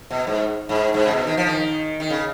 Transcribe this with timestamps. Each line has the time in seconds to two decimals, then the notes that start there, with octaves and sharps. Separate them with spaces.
0.11 B2
0.27 G#2
0.69 G#2
0.94 G#2
1.05 C#3
1.11 B2
1.27 D#3
1.37 F3
1.47 D#3
2.00 D#3
2.10 C#3